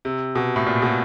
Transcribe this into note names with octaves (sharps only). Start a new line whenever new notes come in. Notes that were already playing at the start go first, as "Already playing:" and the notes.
C3
B2
A2
A#2
B2